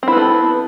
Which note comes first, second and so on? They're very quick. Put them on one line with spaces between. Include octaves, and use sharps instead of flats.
C4 E4 B3 A4